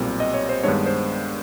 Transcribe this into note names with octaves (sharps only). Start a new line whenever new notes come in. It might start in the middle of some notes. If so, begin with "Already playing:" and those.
Already playing: B1 A#2 G3 C4
D#5
C#5
C5
G2 D#3 G#3 B3 D4 C#5
C5